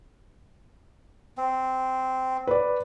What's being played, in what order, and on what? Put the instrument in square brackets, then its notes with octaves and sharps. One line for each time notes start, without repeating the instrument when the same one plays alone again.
[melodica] C4
[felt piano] B4 D5